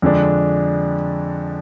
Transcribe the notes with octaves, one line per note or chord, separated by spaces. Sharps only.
F2 D3 G#3 D4